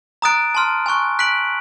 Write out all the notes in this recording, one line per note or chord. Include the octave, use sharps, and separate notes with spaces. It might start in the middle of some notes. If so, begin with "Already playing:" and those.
A#5 D#6 F#6 A6 D7
A5 C6 F6
G#5 C#6 F#6
F#6 B6 D7 F#7